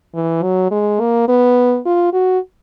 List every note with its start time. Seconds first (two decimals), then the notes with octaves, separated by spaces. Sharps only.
0.15 E3
0.43 F#3
0.72 G#3
1.00 A#3
1.28 B3
1.86 F4
2.13 F#4